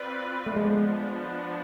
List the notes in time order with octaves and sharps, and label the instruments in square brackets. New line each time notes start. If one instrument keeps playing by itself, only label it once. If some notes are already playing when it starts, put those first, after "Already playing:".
Already playing: [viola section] C4 F4 B4 D5
[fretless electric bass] A3
[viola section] F3 B3 D4 [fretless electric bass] G#3